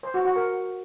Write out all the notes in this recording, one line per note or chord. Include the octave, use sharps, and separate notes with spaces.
C5
F#4
F#4
A#4